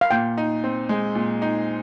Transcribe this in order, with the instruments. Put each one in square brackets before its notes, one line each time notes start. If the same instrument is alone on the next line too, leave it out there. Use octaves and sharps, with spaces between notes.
[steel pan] F5
[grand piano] A#2 [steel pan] G5
[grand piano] D#4
C4
G#3
A#2
D#4